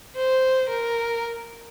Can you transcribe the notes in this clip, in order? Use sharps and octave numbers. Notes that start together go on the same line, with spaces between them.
C5
A#4